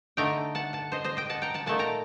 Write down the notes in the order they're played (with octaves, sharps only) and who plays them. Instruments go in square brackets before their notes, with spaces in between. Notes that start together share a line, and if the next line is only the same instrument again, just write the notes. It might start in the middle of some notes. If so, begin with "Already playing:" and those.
[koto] D3 A3 D#4 G5 A#5
F#5 A5
F#5 A5
C5 D#5
C5 D#5
D#5 G5
F#5 A5
G5 A#5
F#5 A5
A#2 A3 D#4 F#5 A5
G5 A#5